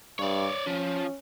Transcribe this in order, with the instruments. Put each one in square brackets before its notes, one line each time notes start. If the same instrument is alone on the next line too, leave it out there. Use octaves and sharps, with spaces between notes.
[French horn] G2 [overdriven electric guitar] C#5 D5
[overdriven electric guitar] F3 [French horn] C#4